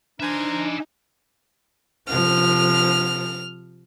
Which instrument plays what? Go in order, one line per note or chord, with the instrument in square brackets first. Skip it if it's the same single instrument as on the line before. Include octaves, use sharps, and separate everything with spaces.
[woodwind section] D4 [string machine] D#4 [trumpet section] A#4 C5 A#5 [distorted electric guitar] E5 G#5
[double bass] C3 F3 [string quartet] F6